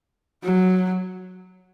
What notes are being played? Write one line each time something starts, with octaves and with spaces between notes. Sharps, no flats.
F#3